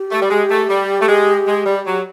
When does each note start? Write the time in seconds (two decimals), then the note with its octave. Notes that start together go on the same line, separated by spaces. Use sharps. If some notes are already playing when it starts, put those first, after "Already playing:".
Already playing: G4
0.11 A3
0.22 G3
0.30 G#3
0.51 A3
0.70 G3
1.01 A3
1.09 G#3
1.48 G#3
1.66 G3
1.87 F#3